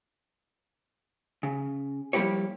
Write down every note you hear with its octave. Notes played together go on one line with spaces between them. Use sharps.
C#3
F3 G3 A#3 E4 G4 C#5